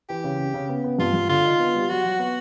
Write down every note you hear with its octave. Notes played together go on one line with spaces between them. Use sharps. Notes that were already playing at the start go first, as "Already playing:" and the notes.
E3 G4
C#3
C#3
C#3
B3
B3
G2 F4
G2
D3 F4
D#4
B3
G3
F#3 F#4
F#3
B3